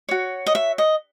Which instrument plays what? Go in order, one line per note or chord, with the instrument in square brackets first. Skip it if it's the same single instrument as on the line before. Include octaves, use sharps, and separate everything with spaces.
[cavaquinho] F#4 C#5
D#5
E5
D#5